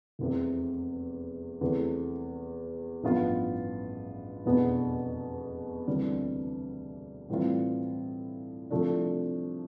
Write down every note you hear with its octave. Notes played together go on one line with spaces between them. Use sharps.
F1 E2 C3
E2 C3 E3 A3
A1 G2 F3 B3 F4
F1 E2 B2 B3 D4
D2 C3 E3 G3
A2 E3 G3 C4 F4
C2 C3 F3 A3 D4